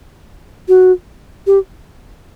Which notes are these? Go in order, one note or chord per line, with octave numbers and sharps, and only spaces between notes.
F#4
G4